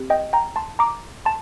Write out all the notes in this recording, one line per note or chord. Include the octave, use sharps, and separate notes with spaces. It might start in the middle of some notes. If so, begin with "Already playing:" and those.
Already playing: C4 G4
D#5 G5
G5 A#5
A5 C6
A#5 D6
A5 C6